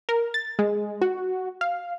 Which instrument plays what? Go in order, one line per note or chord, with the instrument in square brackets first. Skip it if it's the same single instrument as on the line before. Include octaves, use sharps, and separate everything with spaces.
[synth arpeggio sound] A#4
A6
G#3
F#4
F5